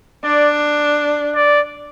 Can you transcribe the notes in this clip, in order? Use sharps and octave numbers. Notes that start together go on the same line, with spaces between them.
D4 D5
D5